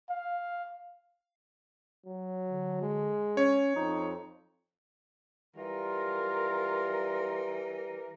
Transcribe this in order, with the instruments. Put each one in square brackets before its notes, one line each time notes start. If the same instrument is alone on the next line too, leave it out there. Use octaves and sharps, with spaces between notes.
[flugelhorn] F5
[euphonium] F#3
[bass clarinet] D3
[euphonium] G#3
[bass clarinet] C#4 [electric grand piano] C#5
[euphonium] F2 [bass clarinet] D#4
[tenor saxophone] E3 [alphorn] G3 [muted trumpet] F4 [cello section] A#4